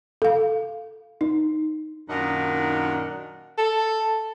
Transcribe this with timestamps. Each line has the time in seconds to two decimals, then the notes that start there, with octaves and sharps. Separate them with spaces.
0.22 A4 F5
1.21 D#4
2.08 F#2 A#2 D#3 D4 D#4 F#5
3.58 A4